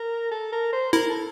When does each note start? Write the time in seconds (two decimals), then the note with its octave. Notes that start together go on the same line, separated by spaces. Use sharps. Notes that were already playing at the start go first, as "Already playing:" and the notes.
Already playing: A#4
0.31 A4
0.52 A#4
0.73 C5
0.93 E4 A#4
1.09 A4